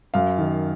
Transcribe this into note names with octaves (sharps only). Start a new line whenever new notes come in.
F#2 F5
D#3